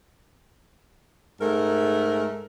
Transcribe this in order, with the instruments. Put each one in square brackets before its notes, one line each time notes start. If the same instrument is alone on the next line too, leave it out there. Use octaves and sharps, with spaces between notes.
[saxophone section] G#2 A3 A#4